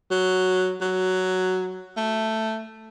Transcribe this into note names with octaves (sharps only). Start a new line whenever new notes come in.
F#3
F#3
A3